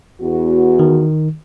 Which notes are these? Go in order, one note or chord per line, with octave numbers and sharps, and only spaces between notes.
E2 F#4
D#3